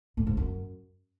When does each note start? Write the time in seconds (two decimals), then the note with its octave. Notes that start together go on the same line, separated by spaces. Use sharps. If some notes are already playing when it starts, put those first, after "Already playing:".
0.17 A2
0.27 G#2
0.37 F#2